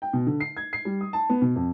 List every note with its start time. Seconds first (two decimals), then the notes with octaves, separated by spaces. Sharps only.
0.02 G5
0.13 B2
0.27 D3
0.40 C7
0.57 G#6
0.73 C7
0.85 G3
1.01 D#6
1.13 A5
1.29 B3
1.42 B2
1.56 F2